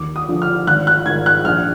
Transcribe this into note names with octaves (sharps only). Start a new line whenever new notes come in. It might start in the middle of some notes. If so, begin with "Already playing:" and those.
Already playing: D#2 D6
D#6
D3 F3
F6
G#1 F#6
F#6
G#2 D#3 G#6
F#6
A#1 F6